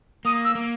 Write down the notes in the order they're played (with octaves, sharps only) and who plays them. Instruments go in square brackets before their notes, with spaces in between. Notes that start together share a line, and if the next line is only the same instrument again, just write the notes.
[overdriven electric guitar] A#3 [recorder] D#6
[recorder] E6
[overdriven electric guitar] A#3